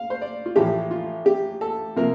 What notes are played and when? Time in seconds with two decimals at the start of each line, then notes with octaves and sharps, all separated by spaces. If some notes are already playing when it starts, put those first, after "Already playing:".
Already playing: F5
0.10 C5
0.22 D5
0.46 F4
0.56 A1 A2 F3 A3 G4
0.91 F4
1.26 G4
1.61 A4
1.96 C3 F3 A#3 A#4